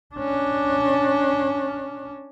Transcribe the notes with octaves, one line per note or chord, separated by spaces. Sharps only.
C#4 D4